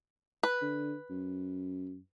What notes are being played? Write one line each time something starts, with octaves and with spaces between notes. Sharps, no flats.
B4
D3
F#2